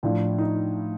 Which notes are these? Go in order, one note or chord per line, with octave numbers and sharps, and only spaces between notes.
A2 F3 D4
D#4